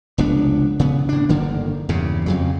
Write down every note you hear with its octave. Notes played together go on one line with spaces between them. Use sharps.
F1 C#2 B3 D4
C#3 B3
A2 D4
G1 D3 D#3 A#3
E2 G2 C#3
F2 C#3 F#3